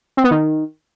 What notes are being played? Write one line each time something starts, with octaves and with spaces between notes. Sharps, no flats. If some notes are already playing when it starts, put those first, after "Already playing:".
C4
B3
D#3